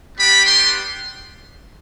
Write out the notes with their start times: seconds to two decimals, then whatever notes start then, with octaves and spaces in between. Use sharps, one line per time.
0.17 G3 B3 D4 G4 B5
0.47 C6